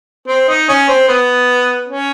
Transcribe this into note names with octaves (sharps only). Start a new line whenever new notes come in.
C4
D#4
C#4
C4
B3
C#4